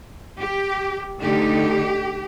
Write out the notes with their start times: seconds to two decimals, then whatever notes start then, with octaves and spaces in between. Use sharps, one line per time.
0.40 G4
1.22 D3 A3 D#4 G4